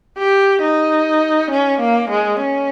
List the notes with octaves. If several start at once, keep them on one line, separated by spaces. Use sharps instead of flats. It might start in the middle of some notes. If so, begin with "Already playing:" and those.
G4
D#4
C#4
A#3
G#3
C#4